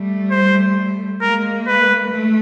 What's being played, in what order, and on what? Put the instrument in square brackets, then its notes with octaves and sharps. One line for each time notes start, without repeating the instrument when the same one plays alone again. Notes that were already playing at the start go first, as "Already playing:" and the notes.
Already playing: [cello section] G3 A3
[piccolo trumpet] C5
[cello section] G#3 A#3 [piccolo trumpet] A#4
[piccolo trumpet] B4
[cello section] A3